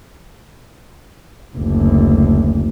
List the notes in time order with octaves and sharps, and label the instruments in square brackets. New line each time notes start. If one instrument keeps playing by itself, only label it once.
[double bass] F#1 D2